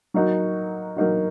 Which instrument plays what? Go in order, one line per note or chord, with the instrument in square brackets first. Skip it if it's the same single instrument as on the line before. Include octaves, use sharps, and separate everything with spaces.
[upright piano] F#3 A#3 D#4 F#4
F#3 A#3 D#4 F#4